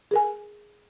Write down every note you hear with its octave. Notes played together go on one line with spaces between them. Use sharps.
G#4 A#4 G#5